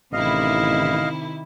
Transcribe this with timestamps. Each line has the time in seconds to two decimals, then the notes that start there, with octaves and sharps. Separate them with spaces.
0.13 A1 C3 D#3 E4 D#5 F5